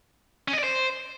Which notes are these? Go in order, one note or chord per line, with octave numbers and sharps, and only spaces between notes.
C#4
D#5
D5
C5